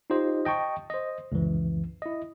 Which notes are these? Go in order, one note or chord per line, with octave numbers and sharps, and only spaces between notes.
D#4 F4 G4 C5 D#5
D#5 G5 A5 C#6
C5 D#5
C#2 F#2 E3
E4 D#5